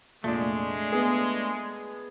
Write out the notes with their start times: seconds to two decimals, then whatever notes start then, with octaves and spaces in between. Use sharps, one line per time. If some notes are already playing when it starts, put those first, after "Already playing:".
0.24 F1 A#2 G#3 A3 D4
0.92 B3 G#4